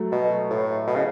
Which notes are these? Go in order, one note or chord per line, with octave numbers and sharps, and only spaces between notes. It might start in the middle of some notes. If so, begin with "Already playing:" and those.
Already playing: F#3 A3
B2
A2
B2
C#3